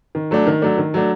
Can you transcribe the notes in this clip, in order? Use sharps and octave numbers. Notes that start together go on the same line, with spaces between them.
D#3
F#3 A3 D4
D#3
F#3 A3 D4
D#3
F#3 A3 D4